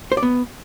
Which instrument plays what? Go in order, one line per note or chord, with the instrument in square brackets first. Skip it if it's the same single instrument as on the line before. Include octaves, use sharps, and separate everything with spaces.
[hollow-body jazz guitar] C5
D5
B3